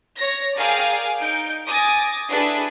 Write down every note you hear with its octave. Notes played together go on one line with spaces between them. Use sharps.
C#5 A#6
G#4 A#4 D5 F5 G5 G#5
D#4 G6 D7
G#5 D6 D#6 A6 A#6
D4 E4 F#4 G#4 A4 B4